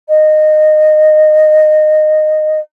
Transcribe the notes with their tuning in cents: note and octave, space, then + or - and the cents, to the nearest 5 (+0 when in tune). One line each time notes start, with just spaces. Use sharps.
D#5 -15